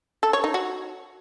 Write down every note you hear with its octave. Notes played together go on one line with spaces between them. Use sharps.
A4
C#5
D#4
F#4